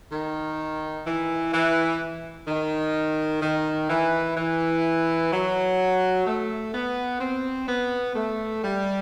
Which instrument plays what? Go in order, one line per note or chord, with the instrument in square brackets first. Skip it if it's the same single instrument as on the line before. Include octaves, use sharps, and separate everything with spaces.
[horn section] D#3
E3
E3
D#3
D#3
E3
E3
F#3
A3
B3
C4
B3
A3
G3